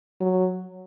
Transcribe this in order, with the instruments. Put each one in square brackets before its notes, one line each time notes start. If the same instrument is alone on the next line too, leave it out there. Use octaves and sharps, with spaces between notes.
[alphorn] F#3